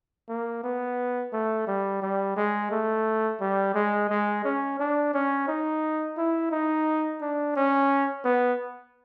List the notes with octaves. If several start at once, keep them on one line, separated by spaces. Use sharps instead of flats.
A#3
B3
A3
G3
G3
G#3
A3
G3
G#3
G#3
C#4
D4
C#4
D#4
E4
D#4
D4
C#4
B3